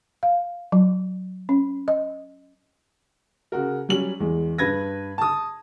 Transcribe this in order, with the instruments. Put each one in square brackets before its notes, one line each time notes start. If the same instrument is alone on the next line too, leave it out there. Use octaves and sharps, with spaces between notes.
[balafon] F5
F#3
C#4
D#5
[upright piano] C#3 F#4 A#4
F#3 G3 C#4 F#7
E2 G#3
G2 B4 G#6 A#6
A5 D#6